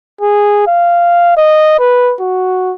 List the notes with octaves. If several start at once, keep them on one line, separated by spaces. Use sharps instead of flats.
G#4
F5
D#5
B4
F#4